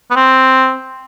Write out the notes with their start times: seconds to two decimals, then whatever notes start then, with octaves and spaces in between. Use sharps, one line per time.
0.11 B3
0.16 C4